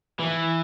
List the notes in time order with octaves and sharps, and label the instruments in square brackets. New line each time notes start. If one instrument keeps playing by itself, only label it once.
[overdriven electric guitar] E3